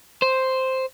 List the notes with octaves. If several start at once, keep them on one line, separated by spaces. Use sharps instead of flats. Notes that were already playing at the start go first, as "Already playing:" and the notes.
C5